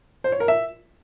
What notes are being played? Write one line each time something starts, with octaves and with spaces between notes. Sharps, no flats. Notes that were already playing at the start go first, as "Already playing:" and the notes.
C5
C#5
A#4
E5